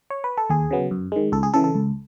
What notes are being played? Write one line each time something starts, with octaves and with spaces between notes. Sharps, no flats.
C#5
B4
A4
D#2 G#4
C#3 F#3 B3
F#2
D#3 G#3
C#2 A4
G#4
C#3 E3 A4
A4
C#2